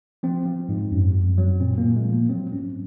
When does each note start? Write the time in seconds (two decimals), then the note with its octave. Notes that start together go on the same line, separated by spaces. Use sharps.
0.23 F3 C4
0.46 F3
0.69 G#2
0.92 F#2
1.15 F#2
1.38 F#3
1.60 A#2 C4
1.78 A#3
1.84 A#2
1.96 G#3
2.07 F3
2.13 A#3
2.30 F#3 C4
2.53 G#2 C#4